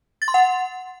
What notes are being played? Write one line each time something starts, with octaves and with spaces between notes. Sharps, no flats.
A6
C6
F#5